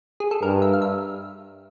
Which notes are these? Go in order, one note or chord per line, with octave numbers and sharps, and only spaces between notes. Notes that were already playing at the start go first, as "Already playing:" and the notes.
G#4
A4
G2 A#4
E5
F5
E5